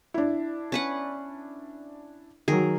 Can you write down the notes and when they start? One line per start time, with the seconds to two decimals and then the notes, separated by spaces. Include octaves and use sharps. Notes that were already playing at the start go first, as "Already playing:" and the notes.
0.14 D4 E4
0.72 C#4 B4 F#5
2.48 D#3 F#3 G#4 A#4